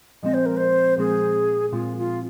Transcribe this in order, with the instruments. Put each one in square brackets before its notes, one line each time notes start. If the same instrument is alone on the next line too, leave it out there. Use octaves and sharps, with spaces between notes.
[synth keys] A#2 F3 G#3 C4 [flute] D#5
[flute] C5
A#4
C5
[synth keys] A#2 F3 G#3 C4 [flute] G#4
[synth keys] A#2 F3 G#3 C4 [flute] F4
[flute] F4